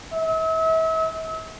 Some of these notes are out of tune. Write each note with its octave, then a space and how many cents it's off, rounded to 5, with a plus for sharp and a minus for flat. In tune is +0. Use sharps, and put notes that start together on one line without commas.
E5 -40